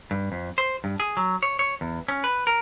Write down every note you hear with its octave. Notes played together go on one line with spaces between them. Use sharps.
G2
F2
C5
G2
G#4
F#3
C#5
C#5
E2
C#4
B4
A#4